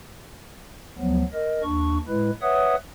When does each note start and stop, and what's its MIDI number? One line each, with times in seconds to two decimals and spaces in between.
0.98 1.23 38
0.98 1.23 53
0.98 1.23 54
0.98 1.23 59
1.33 1.63 70
1.33 1.63 75
1.63 1.98 39
1.63 1.98 62
1.63 1.98 85
2.08 2.30 45
2.08 2.30 56
2.08 2.30 64
2.08 2.30 71
2.42 2.76 71
2.42 2.76 73
2.42 2.76 76
2.42 2.76 78
2.42 2.76 87